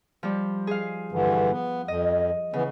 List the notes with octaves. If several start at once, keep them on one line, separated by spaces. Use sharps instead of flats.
F3 G3
G#4 F5
G2 D3 E3
B3
F2 D#5
C#3 E3 B3